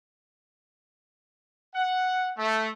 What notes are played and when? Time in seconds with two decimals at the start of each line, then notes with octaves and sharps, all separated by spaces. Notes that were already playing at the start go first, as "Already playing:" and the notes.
1.75 F#5
2.38 A3